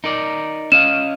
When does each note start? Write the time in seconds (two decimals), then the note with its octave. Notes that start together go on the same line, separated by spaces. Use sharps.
0.04 D#4 A#4 D5
0.72 C#4 D#5 F5 E7